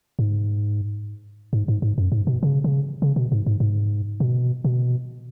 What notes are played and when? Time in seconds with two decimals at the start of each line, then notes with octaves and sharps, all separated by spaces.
0.19 G#2
1.53 G#2
1.68 G#2
1.82 G#2
1.98 F#2
2.12 G#2
2.27 B2
2.43 C#3
2.64 C#3
3.02 C#3
3.16 B2
3.32 G#2
3.47 G#2
3.60 G#2
4.20 B2
4.65 B2